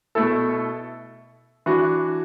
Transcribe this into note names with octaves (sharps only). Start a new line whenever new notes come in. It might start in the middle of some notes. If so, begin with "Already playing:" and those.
B2 A3 E4 A4
E3 D4 F#4